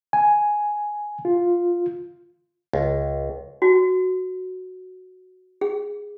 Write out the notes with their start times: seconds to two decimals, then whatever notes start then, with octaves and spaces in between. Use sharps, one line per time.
0.13 G#5
1.25 F4
2.73 C#2
3.62 F#4
5.61 G#4